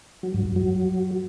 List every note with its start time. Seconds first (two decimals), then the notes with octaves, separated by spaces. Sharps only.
0.23 F#3
0.34 G2
0.45 F#2
0.56 F#3